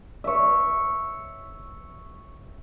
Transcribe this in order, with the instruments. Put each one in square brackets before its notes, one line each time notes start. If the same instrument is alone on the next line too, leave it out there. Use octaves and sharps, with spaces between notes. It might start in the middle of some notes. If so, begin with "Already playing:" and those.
[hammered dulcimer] C#5 E5